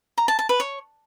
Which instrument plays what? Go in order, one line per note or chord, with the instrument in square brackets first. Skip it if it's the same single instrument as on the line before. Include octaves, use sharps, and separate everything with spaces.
[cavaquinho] A#5
A5
A5
B4
C#5